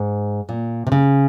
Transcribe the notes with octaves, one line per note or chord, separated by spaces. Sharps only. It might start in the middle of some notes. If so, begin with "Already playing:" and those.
Already playing: G#2
A#2
C3
C#3